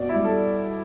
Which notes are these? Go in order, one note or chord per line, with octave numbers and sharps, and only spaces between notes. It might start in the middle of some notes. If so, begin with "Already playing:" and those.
Already playing: B2 D5
G3 E4
A4